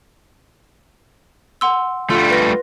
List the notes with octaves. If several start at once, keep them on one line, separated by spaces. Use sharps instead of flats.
F#5 C6 E6
D3 G3 A3 F4 C6
B4 A#6